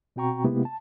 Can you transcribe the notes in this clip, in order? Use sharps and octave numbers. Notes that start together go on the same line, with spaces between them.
B2 C4 F#4 G5 A#5 C#6
C3 G#3 A#3 B3 E4 G4
A5